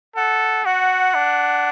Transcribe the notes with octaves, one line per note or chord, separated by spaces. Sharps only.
A4 F#5
F#4 F#5
D4